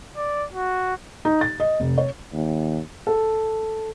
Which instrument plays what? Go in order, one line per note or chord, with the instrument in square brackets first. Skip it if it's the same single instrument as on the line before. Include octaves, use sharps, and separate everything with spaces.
[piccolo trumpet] D5
F#4
[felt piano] D#4
A6
D#5
F1
C#5
[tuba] D#2
[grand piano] A4